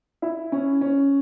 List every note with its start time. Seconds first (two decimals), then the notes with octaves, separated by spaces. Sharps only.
0.22 E4
0.52 C#4
0.81 C#4